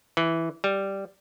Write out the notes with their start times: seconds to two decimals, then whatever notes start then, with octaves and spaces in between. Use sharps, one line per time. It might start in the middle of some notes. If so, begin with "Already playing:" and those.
0.17 E3
0.64 G3